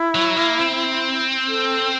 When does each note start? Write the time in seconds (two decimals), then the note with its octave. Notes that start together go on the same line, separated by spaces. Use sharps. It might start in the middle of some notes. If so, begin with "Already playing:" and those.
Already playing: E4
0.15 F#3
0.37 A#3
0.59 C4
1.48 A4